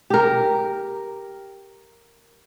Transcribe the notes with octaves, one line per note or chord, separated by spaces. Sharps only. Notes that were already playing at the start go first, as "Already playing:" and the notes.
G4 A#4